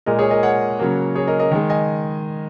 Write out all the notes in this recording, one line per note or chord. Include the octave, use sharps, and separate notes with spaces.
A#2 G#3 A#4 D#5
G#4 C#5
A#4 D#5
C#5 F#5
C#3 F#3 A#3
G#4 C#5
A#4 D#5
A#4 D#5
D#3 G#3
D#5 G#5